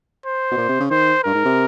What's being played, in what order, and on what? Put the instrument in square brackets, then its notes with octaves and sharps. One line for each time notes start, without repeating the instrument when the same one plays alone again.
[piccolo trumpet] C5
[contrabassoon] B2
A#2
C3
C#3
[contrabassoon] D#3 [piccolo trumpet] C5
[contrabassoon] G2 [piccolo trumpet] A#4
[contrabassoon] G#2
C3